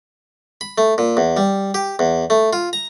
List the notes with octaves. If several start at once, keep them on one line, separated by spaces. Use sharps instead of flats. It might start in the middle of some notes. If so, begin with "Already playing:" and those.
B5
A3
A#2
E2
G3
G4
E2
A3
F4
A#5